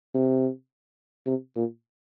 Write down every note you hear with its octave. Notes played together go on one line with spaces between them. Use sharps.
C3
C3
A#2